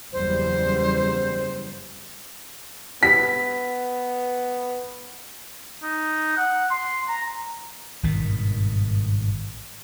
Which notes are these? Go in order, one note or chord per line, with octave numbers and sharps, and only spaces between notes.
F#1 E2 G3 C5
B3 B6
D#4
F#5
C6
A#5
G#1 G2 B2 D#3